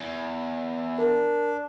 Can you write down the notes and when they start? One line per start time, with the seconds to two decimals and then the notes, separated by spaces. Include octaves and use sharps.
0.01 E2
0.98 D4 A#4